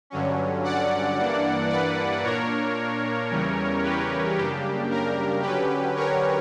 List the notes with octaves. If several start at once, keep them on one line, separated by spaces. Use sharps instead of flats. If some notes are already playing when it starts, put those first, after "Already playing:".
G2 D3 F#3 C#4
D5 F#5
G2 E3 A#3 D4
B4 D5
A#2 A#3 D4 A#4 C#5
E2 C#3 E3 G3 C#4
G4 B4
F#2 C#3 G3 A#3 D4 G4
A#4
D3 F#3 C#4 G4 B4
A#4 C#5